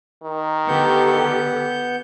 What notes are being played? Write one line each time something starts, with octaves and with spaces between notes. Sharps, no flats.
D#3
D3 B3 G4 A4 F#5 G6